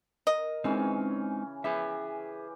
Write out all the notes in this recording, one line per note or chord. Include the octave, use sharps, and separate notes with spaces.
A#4 D#5
C#3 E3 G#3 C4 C#4 D#4
E3 G4 G#4 B4 E5